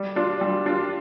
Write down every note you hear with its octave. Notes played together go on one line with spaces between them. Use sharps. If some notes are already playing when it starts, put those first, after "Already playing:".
Already playing: G3
D4 F4
G3
D4 F4